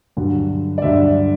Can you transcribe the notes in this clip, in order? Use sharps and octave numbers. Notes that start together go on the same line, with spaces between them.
G2 D3 F#3
D5
G2 D3 F#3 E5